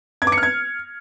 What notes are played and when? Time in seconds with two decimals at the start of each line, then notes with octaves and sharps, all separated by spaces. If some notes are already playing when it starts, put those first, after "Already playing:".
0.22 G#6
0.27 D6
0.32 C#7
0.38 F6
0.43 G#6